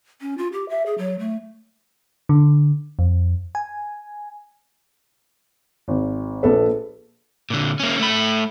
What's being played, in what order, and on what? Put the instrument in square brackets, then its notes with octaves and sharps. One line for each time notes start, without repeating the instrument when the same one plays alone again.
[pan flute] C#4
F4
G4
E5
G#4
F#3
A3
[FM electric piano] D3
F2
G#5
[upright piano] G#1
A#1 A4 B4
[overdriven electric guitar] A#2 D3
A#3 C#4
A3 B5